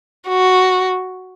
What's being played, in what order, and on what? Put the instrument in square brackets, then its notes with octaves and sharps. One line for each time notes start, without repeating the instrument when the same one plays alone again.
[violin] F#4